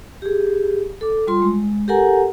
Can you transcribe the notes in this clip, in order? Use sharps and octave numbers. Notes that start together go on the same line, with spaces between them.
G4 G#4
A4 D6
G3 F4 C6
G#3
G4 A4 A#4 F#5 G#5 A#5